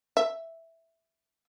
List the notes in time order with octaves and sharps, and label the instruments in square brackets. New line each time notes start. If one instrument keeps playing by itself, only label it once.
[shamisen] E5